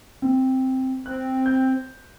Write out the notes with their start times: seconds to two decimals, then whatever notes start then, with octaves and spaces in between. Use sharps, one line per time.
0.22 C4
1.06 C4 F#6
1.46 G6